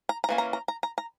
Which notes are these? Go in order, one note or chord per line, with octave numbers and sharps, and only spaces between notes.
A#5
A#5
E3 A#3 C#4
A#5
A#5
A#5
A#5
A#5